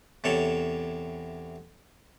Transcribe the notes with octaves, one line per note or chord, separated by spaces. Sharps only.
E2 C3 A4 C#5